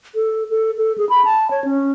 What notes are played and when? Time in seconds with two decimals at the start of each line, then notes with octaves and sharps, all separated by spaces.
0.15 A4
0.51 A4
0.78 A4
0.98 G#4
1.09 B5
1.25 A5
1.51 C#5
1.64 C#4